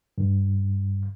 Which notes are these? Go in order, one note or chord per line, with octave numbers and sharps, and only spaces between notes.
G2